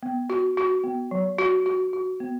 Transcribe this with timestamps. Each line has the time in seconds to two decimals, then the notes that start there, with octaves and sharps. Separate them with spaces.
0.03 B3
0.30 F#4
0.57 F#4
0.84 B3
1.11 F#3
1.38 F#4
1.66 F#4
1.93 F#4
2.20 B3